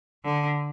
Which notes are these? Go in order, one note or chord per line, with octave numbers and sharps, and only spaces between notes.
D3